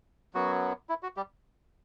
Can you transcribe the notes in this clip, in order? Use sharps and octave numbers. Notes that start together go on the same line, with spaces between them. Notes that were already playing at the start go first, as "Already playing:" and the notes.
F#2 F#3 B3 F#4
E4
F#4
G3 G4